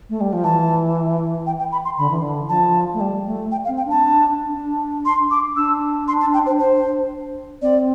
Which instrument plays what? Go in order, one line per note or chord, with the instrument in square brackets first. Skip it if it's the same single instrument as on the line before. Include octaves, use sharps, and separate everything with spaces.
[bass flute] A3
G3
F3
[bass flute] E3 [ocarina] A5
[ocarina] G5
G5
B5
C6
[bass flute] D3 [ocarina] B5
[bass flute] E3
D3
[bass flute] F3 [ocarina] A5
[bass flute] A3
G3
A3
[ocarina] G5
F5
[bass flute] C4
[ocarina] G5
[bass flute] D4 [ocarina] A5
[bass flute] D4
[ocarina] C6
D6
[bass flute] D4 [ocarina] E6
[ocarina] C6
A5
G5
C5
C5
[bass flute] C4 [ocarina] D5